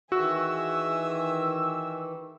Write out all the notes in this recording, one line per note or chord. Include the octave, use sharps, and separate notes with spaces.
D#3 E3 F#4 G#4 E5 E6